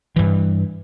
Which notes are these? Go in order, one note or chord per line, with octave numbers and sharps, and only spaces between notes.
G2 E3